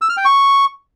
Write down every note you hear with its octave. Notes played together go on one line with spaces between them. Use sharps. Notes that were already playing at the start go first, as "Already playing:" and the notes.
E6
F6
G5
C#6